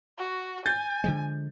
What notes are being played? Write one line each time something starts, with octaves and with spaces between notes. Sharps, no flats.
F#4
G#5 G6 A6
D3 F3 G#3